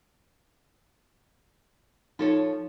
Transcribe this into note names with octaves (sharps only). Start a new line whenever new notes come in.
F3 D#4 A4 C#5